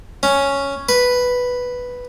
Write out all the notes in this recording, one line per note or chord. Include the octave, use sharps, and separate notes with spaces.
C#4
B4